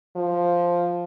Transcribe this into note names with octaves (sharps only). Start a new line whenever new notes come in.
F3